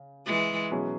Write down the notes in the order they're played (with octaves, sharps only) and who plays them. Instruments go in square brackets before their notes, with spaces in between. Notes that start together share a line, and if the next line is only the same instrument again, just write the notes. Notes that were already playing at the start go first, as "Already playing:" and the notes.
Already playing: [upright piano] C#3
[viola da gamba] E3 G#3
[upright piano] B2 F#3 C#4 G#4